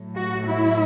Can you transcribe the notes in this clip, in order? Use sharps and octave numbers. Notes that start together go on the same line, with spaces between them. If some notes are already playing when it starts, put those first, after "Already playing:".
Already playing: A2 F#3
F#4
E4